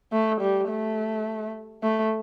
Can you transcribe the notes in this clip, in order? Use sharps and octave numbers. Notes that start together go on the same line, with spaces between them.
A3
G3
A3
A3